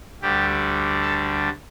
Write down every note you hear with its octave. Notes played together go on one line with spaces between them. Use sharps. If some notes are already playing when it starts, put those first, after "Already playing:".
D2 D3 G3 G4
A4